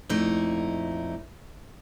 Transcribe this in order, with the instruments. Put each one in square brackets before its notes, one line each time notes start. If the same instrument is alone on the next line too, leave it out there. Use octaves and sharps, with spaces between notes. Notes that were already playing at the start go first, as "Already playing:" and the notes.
[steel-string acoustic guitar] F2 A#2 A3 D#4 E4